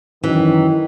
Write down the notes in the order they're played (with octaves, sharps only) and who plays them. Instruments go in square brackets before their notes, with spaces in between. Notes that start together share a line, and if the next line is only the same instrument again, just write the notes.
[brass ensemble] F#2 D#3 [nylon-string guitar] E3